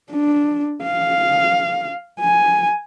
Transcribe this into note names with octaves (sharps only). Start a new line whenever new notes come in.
D4
F5
G#5